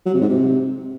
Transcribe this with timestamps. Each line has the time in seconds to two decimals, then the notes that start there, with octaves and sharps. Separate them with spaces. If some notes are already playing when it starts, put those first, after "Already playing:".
0.06 F#3
0.14 C3
0.21 G#2
0.29 C3